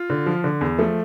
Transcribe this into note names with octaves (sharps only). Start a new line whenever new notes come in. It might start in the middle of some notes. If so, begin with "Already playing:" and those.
Already playing: F4
D3
F3
D3
E2
F3 A3